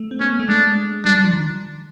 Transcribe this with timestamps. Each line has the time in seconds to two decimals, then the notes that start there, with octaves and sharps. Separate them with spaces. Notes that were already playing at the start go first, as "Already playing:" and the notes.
Already playing: A3
0.11 C4
0.20 B3 C#4
0.30 A#3
0.39 A3
0.49 G#3 D4
1.05 G3 D4
1.15 G3
1.24 F3
1.33 D#3